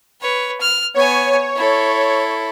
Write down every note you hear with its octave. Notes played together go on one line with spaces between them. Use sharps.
B4 C#5
F6
B3 C#5 G#5
E4 A4